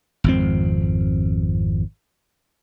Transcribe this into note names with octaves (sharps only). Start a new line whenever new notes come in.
G#1 F2 C4